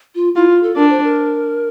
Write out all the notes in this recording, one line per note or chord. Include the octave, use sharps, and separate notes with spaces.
F4
E4 F4
F4
A4
D4 A#4
C5
A#4